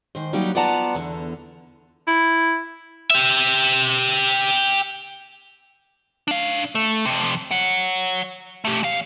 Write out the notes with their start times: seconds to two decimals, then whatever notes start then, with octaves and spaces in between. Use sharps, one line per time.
0.15 G#2 D#3 C5
0.33 F#3 G3 A#3 D#4 F#4 G4
0.55 B3 F4 D5 F#5 A5 A#5
0.95 E2 D3
2.08 E4
3.10 G4 E5
6.28 D4 F5
6.75 A3
7.05 F2 C3
7.51 C#5 F#5
8.65 A3 G4
8.83 E2 F5